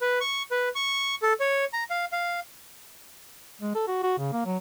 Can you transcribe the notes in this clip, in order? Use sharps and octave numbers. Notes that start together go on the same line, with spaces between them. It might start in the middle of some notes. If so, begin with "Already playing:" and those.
B4
C#6
B4
C#6
A4
C#5
A#5
F5
F5
G#3
A4
F#4
F#4
C#3
A#3
F#3